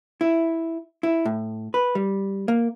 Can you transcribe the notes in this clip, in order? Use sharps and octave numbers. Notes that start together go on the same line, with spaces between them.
E4
E4
A2
B4
G3
A#3